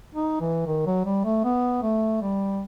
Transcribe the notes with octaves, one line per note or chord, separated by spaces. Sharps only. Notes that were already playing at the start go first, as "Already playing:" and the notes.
D#4
E3
D#3
F#3
G3
A3
B3
A3
G3